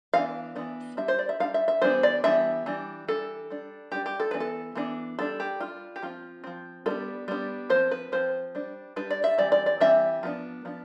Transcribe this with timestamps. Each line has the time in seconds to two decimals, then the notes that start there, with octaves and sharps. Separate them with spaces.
0.14 E3 B3 D4 F5
0.56 E3 B3 D4
0.97 G3 D4 E5
1.08 C5
1.19 D5
1.29 E5
1.40 G3 D4 F5
1.54 E5
1.68 E5
1.82 E3 G3 B3 D4 C5
2.03 D5
2.24 E3 G3 B3 D4 E5
2.66 E3 G3 D4
3.08 E3 G3 D4 A4
3.50 G3 D4
3.92 G3 D4 G4
4.06 G4
4.20 A4
4.31 E3 B3 D4 B4
4.40 A4
4.75 E3 B3 D4
5.19 G3 D4 A4
5.40 G4
5.61 G3 D4 F4
5.96 G4
6.02 F3 C4 F4
6.44 F3 C4
6.86 G3 B3 D4 A4
7.28 G3 B3 D4
7.70 F3 C5
7.75 C4
7.91 B4
8.12 F3 C4 C5
8.55 G3 D4
8.96 G3 D4 B4
9.11 D5
9.24 E5
9.38 E3 G3 C4 D5
9.52 D5
9.66 D5
9.81 E3 G3 C4 E5
10.23 F3 B3 D4
10.65 F3 B3 D4